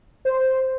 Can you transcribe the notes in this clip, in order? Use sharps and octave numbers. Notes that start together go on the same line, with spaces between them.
C5